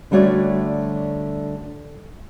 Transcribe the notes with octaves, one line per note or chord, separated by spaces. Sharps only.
D3 G3 A3 F#4 C#5 D5